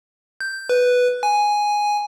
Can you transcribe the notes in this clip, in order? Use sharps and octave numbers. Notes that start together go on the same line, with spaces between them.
G6
B4
G#5